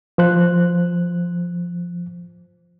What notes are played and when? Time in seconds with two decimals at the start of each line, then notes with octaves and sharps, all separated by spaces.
0.18 F3 C5 F#6